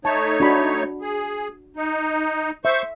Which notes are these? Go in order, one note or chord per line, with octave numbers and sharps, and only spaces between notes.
A3 D#4 C#5 A5
D4 F#4 B5
G#4
D#4
C5 E5 C#6